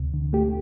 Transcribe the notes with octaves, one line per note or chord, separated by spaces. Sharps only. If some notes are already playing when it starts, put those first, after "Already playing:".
Already playing: D2 C3
D3
A3 G4